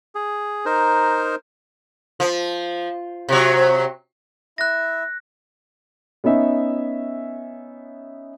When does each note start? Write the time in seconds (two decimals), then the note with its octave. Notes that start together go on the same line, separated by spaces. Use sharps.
0.15 G#4
0.66 D#4 A#4 C5
2.20 F3
3.29 C3 F#3
4.58 E4 E5 F#6 A#6
6.24 B3 C#4 D#4 E5